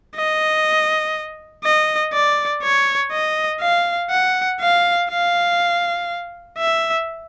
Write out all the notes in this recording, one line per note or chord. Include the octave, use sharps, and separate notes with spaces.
D#5
D#5
D5
C#5
D#5
F5
F#5
F5
F5
E5